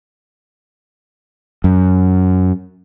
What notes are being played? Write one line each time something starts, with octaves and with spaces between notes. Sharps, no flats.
F#2